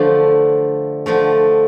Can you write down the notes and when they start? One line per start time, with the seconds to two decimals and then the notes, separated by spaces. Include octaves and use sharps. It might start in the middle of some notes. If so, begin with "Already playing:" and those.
Already playing: D3 F3 A3 D4
1.06 D3 F3 A3